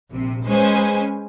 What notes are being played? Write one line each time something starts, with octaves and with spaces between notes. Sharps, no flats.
A#1 C3
G#3 C#4 B4 C5 G#5